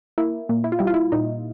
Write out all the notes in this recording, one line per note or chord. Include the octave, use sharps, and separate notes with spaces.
A#3 E4
A#2
E4
F4
G3 E4
F4
E4
A#2 D#4